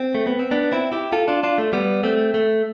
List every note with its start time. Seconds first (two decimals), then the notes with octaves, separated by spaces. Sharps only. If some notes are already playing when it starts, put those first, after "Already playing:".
Already playing: C4
0.15 A3
0.27 B3
0.39 C4
0.51 B3 D4
0.72 C4 E4
0.92 E4 G4
1.12 F4 A4
1.28 D4 F4
1.43 D4 F4
1.58 A3
1.73 G3 B3
2.03 A3 C4
2.34 A3